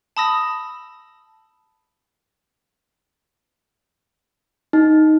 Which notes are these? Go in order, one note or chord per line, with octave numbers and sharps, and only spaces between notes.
A5 B5 D#6 E6 A#6
D#4